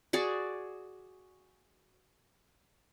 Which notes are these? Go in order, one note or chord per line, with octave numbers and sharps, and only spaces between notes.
F#4 G#4 D5